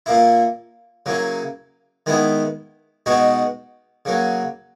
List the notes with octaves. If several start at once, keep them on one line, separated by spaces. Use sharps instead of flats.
A#2 A#3 E4
C#3 F#3 A#3 E4
D#3 G#3 B3 E4
B2 G#3 D#4 F#4
C#3 F#3 A#3